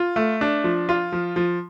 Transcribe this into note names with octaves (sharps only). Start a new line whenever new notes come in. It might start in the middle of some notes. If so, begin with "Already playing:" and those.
Already playing: F4
A3
D4
F3
F4
F3
F3